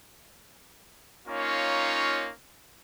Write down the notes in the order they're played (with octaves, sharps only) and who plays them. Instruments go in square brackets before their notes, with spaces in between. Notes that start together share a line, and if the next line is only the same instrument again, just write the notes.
[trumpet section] A#3 C#4 D#4 F4 C#5